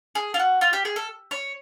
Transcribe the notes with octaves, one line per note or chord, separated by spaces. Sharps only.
G#4
F4
F#4
F4
G4
G#4
A4
C#5